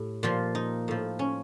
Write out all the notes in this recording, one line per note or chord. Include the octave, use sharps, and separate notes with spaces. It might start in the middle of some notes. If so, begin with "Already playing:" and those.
Already playing: A2 G4
A#2 F3 F4
D#4
A2 F3
C#4